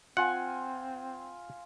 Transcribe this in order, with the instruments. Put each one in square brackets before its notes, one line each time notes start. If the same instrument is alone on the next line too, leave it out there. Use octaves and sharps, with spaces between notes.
[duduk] C4 [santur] F4 G#5 [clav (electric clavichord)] F#5